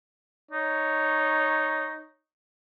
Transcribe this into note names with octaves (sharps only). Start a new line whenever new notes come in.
D#4 C#5